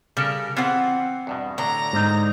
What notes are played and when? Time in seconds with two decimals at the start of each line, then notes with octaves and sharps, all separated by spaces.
0.17 C#3 G3 A4 A#4
0.57 E3 B3 C4 F4 F#5
1.27 E2 G2 B2
1.58 A2 D3 A#5
1.93 G#2 D#4